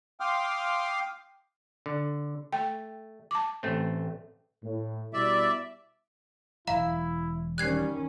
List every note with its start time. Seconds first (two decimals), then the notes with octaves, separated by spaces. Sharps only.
0.20 F5 G5 C6 D6 D#6 F6
1.86 D3
2.53 A3 G5
3.31 A5 D6
3.63 A1 A3 C4
4.64 A2
5.13 B2 G3 E4 D5 E5
6.67 E1 C2 F#3 E4 E5 F5 A#5
7.58 D#3 G3 C#4 F#6 G#6 C7